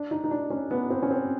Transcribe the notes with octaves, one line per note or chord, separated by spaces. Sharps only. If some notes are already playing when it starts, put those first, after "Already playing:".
Already playing: D4
D#4
D#4
D4
C#4
B3
C4
C#4
C4